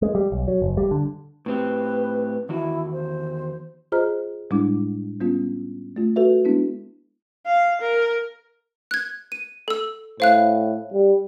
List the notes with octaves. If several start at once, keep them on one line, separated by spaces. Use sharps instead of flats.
G#3
G3
B1
F#3
F#1
G3
D3
A2 C4 G4 B4
E2 D#3 E4 F#4
C5
F4 G#4 C5 D#5 A#5 F6
A2 G3 G#3 D4 E4 D6
G3 B3 C#4 F4
A3 F4
F#4 A4 B4 E5
G#3 B3 D4 E4
F5
A#4
F#6 G#6
D#7
A4 E6
A2 C5 F5 F#6
G3